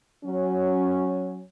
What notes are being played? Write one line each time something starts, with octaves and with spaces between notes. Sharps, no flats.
F#3 C#4